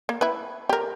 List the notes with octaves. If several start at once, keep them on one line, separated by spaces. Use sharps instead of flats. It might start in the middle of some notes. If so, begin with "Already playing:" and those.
A#3
E4 B4
G4 A#4